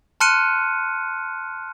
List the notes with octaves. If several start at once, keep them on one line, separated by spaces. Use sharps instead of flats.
A5 C6 F6 F#6 C#7 D#7